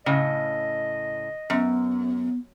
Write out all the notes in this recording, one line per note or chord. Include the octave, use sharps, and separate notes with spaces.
A2 C#3 D#5
F#2 B3